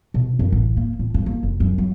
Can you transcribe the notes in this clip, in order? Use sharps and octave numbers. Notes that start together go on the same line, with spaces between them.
B2
F#2
A1
A#3
A2
G2
A#3
F1
F#2
F#3